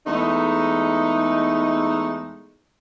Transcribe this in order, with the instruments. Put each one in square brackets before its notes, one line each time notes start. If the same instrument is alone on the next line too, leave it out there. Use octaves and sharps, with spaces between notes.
[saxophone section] E2 G#3 A3 D#4